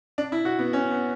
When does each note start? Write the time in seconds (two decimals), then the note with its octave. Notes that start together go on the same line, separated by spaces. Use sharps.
0.18 D4
0.32 E4
0.45 F#4
0.59 B3
0.73 C#4
0.91 B3